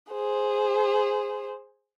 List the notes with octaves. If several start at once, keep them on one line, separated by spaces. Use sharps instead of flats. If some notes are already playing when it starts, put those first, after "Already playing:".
G#4 C5